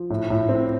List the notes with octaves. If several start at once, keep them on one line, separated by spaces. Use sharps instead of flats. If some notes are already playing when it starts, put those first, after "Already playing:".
Already playing: F3
A2
A2
C4